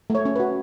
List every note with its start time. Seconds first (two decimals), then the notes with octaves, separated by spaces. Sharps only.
0.10 A3 C#5
0.25 C#4
0.36 F#4 B4